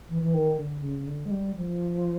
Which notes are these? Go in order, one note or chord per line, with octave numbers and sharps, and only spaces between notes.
E3
E3
D#3
D3
C#3
D3
G#3
G3
F3